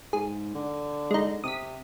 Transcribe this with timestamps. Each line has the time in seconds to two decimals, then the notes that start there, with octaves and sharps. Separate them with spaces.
0.13 G#2 G#4
0.55 D3
1.11 G#3 D#4
1.44 C3 D#6 B6